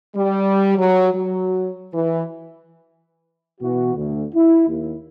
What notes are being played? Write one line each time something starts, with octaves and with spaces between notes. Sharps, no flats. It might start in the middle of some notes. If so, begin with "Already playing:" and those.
G3
F#3
F#3
E3
B2 E3 F#4
D2
E4
D#2